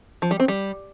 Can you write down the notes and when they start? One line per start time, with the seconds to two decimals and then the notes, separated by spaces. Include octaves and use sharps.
0.22 F3
0.31 G3
0.40 C4
0.48 G3